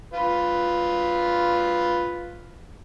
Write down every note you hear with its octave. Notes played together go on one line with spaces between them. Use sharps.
F4 B4